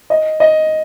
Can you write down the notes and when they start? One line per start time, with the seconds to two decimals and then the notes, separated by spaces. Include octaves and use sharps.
0.10 D#5
0.40 D#5